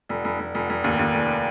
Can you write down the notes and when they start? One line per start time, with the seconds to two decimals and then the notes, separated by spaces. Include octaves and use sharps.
0.09 F1
0.24 F1
0.39 F1
0.55 F1
0.69 F1
0.84 D#2
0.99 D#2
1.14 F1